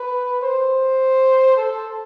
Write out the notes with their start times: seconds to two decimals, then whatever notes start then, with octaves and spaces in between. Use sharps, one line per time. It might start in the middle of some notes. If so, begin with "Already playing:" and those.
Already playing: B4
0.42 C5
1.57 A4